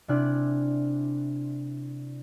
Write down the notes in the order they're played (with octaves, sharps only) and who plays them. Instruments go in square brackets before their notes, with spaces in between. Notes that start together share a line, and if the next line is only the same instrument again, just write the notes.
[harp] C3 D4 E4 G#5 F6 F#6